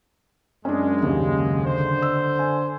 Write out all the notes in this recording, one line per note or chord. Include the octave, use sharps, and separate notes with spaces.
F#2 G#3 C#4 D4
D#2 G#2 C#3
D3 C5
E6
G#5